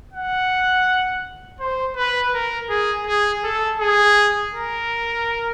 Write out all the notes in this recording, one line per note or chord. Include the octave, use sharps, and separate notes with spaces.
F#5
C5
B4
A#4
G#4
G#4
A4
G#4
A#4